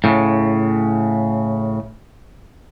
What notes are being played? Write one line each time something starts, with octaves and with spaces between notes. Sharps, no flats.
A2 C#3